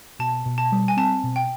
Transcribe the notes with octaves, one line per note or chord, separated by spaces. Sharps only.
B2 A5
B2
A5
G3
G#5
C4 A5
B2
G5